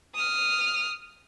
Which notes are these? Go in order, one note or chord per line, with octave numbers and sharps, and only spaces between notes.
D#6 F6